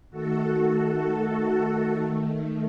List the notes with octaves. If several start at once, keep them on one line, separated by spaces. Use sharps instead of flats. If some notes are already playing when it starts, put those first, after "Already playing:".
D#3 A3 F#4 A4
D#3 A3